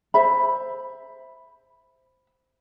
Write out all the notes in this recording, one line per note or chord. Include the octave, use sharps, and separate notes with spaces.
C5 E5 B5